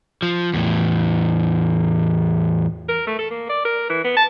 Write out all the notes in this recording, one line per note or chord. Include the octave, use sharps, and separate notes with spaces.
F3
E2 A2
A#4
A3
A4
A#3
D5
A#4
E3
B3
A5